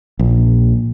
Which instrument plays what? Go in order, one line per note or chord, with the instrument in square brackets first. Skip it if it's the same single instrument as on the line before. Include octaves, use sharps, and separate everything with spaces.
[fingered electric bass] A#1